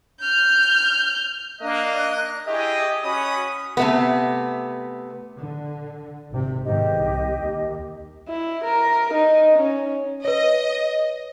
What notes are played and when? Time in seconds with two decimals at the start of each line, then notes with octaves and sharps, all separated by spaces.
0.20 F6 G6
1.61 A#3 D4 D#5 F#6
2.47 E4 G4 G#4 D#5 C#6
3.04 C#4 F#4 B5 D#6
3.77 C3 A3 B3
5.38 D3
6.30 G#1 C3
6.64 G#2 B2 D#3 G4 D#5
6.95 C2
7.42 D#2
8.29 E4
8.65 A#4
9.14 D#4
9.58 C#4
10.25 B4 C#5 D#5